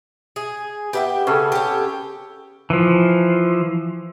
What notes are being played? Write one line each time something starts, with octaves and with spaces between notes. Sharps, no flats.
G#4
B3 G4 E5 G5
C#3 C#4 G#4 A4
G4 C#5
E3 F3